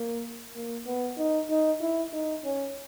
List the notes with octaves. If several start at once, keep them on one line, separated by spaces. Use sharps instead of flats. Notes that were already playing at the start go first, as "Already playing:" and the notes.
Already playing: A#3
A#3
B3
D#4
D#4
E4
D#4
C#4